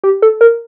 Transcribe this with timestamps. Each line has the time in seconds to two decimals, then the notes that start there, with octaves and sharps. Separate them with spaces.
0.03 G4
0.22 A4
0.41 A#4